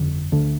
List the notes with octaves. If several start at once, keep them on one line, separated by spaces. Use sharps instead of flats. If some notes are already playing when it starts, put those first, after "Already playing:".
Already playing: G1 F2 D3
D2 D3